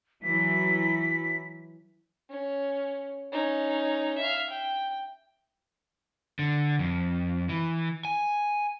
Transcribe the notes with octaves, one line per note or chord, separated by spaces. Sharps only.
E3 F#3 B6
C#4
C#4 D#4
E5 F5
G5
D3
F2
E3
G#5